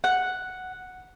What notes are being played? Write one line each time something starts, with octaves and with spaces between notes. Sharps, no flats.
F#5